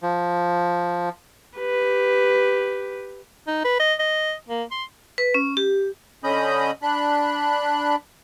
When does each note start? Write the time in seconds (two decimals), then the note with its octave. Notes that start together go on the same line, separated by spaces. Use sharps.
0.03 F3
1.58 G4 B4
3.47 D#4
3.64 B4
3.80 D#5
3.99 D#5
4.48 A#3
4.71 C6
5.18 B4
5.34 C#4
5.57 G4
6.24 D3 C#4 D#5 B5 D#6 G6
6.82 D4 B5 F#6